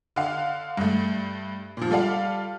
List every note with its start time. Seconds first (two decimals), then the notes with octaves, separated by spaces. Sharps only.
0.16 D3 F5
0.77 G2 A3
1.77 A#2 F3
1.90 G3 F4 A4 D5 F5